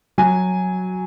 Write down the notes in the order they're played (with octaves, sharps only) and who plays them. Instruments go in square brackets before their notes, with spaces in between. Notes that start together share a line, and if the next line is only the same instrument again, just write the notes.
[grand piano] F#3 G#5